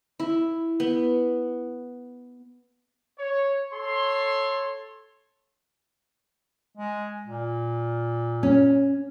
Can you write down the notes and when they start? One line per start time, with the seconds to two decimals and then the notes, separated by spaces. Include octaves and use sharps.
0.20 E4
0.80 B3
3.19 C#5
3.73 A4 C#5 C6
6.77 G#3
7.26 A#2
8.43 C#4